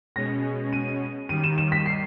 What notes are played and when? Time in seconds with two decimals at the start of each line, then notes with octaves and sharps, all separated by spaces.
0.16 B2 G#3 C#4 A#6
0.73 D#7
1.29 D#2 D#3 G3 D#7
1.44 E7
1.58 E7
1.72 B6
1.86 C7